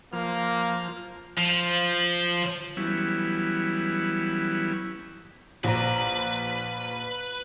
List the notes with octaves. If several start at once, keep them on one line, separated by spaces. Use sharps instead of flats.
F3 A#3 F6
F3
E3 F#3 G3 B3 C#4 E4
A#1 B4 A#5